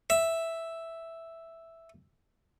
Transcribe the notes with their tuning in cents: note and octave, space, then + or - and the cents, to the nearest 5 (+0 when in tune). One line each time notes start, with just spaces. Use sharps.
E5 +0